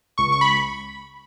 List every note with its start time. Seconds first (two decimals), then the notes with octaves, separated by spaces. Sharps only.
0.18 C#2 C#6
0.32 C#6
0.41 B5